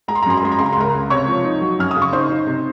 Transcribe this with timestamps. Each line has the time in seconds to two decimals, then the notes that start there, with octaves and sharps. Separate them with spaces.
0.08 G#3 A#5
0.15 C6
0.23 A#5
0.26 F#2 C6
0.37 A#5
0.43 G#3 C6
0.52 A#5
0.59 C#3 C6
0.66 A#5
0.73 C6
0.76 C#2 A#4 A#5
0.94 C#2
1.10 C3 C#5 C#6
1.28 F3
1.45 D#4
1.61 F#3
1.79 F#2 F6
1.91 C#3 D#6
2.02 C#6
2.13 D#4 C5 C6
2.30 D#4
2.47 C3